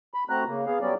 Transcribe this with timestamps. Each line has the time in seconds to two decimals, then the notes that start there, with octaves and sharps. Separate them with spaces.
0.14 B5
0.29 A3 C4 F#4 A#5 F#6
0.47 C#3 A#3
0.66 B3 G#4 F5
0.81 F#2 F#3 G3 B3 C#4 D5